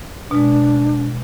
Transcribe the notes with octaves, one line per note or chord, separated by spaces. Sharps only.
B2 G#3 D4